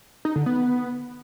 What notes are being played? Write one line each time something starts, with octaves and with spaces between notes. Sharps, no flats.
D#4
D3
B3